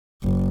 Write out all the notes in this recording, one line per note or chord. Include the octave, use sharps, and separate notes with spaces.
F#1